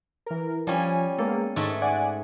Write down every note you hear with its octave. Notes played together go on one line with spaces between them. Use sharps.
E3 A#4
F3 G3 C#4 G#5
G#3 A#3 B3 A4
G#2 D#3 A3 E5
D5 F#5 G#5